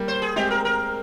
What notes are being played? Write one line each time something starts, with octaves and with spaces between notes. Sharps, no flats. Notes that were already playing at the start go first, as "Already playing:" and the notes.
Already playing: G3 A#3
C5
G#4
G#3 C4 G4
A#4
A#4